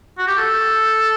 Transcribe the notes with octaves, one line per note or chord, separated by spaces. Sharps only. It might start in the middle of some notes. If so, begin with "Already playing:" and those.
F#4
G4
A4